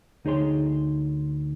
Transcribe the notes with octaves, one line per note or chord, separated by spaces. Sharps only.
D2 D#4 G#4 C#5 C6